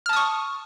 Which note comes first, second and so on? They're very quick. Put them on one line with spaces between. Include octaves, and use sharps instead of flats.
F6 A5 D#6 C#6